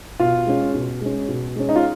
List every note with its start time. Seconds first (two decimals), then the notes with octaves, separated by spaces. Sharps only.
0.20 B2 F4
0.47 G#3 C#4
0.74 B2
1.01 G#3 C#4
1.29 B2
1.56 G#3 C#4
1.69 D#4
1.76 F4